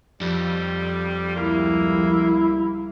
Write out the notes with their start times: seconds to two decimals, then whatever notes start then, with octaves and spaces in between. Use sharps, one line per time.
0.21 F2 G3
1.36 C#2 G3 A#3 E4